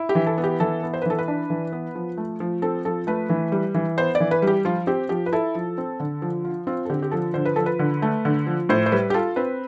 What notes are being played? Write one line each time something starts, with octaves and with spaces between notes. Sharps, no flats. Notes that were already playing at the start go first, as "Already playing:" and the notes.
Already playing: E4
G4
E3
A4
B3
G4
E3 A4
B3
C5
B4
E3 A4
B4
D4
E3
B3
F3
A3
F3
C4 A4
F3 A4
A3 B4
E3
G3
E3
B3 C5
D5
E3
B4
G3
G4
F3 F4
C4 G4
F3 G4
B4
E4 A4
F3
C4
D3
F3
F4
C4 F4
A4
D3 G4
G4
F3 A4
D3 C5
B4
F3 A4
B4
D3
A3
D3
F3
A2 C5
C5
G3 B4
G4
F4 A4
C4 B4